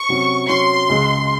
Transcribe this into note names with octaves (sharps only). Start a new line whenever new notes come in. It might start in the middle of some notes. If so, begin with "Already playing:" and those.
Already playing: C#6
C3 F#3 C#4
C3 F#3 C#4 C6
C#2 C#3 G#3